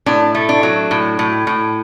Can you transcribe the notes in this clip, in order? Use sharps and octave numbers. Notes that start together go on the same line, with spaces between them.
A2 D4
A3
D4
F#3
A2
A2
A2